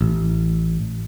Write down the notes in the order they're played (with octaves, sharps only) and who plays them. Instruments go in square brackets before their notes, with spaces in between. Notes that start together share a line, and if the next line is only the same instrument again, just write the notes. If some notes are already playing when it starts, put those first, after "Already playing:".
[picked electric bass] A1